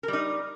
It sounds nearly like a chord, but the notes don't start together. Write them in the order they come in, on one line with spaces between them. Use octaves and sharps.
A#4 G3 D#4